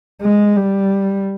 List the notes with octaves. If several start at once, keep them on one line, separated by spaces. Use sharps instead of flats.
G#3
G3